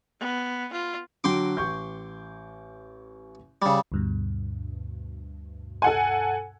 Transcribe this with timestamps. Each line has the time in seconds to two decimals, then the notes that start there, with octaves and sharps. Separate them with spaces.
0.20 B3
0.73 F4
1.24 D3 F#3 F#4 G5 C6 D6
1.57 A1 C#6 G6
3.62 C#3 G3
3.92 D2 G2 B2
5.82 A4 F#5 G#5